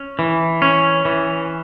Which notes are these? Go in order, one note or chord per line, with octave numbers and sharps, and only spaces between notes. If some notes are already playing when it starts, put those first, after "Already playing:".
Already playing: C#4
E3
C#4
E3